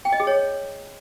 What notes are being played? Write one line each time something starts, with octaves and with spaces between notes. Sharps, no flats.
G5
D#5
G#4
C#5